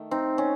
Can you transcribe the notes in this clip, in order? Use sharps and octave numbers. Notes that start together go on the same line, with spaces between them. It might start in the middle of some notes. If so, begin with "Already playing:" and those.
Already playing: D#3 A3
C4 D#4
C#4